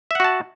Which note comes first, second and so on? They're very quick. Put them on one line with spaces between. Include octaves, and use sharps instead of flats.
E5 F#5 F#4 A5